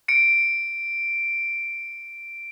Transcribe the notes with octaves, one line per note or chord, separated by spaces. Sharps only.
C#7 D7